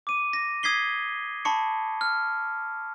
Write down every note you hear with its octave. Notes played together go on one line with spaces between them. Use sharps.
D6 D#7
A#6
D#6 G#6 B6 C7 G7
A5 B5 C#6 C#7
F6